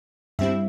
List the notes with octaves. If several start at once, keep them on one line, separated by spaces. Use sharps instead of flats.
G2 G3 C4 E4 E5